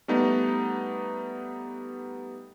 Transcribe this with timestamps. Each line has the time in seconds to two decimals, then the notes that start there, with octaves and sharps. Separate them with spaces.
0.08 G3 A3 B3 D#4